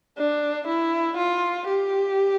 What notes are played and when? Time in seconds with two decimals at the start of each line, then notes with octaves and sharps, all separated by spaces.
0.18 D4
0.68 E4
1.18 F4
1.68 G4